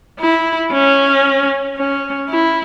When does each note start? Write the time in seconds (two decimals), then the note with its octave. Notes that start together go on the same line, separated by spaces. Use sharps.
0.20 E4
0.72 C#4
1.78 C#4
2.29 E4